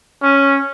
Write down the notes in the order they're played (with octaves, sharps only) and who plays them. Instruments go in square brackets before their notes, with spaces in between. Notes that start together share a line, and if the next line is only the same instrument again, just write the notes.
[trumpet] C#4